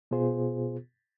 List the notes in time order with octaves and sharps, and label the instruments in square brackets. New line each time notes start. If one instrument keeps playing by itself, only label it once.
[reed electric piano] B2 B3 F4 G#4 C5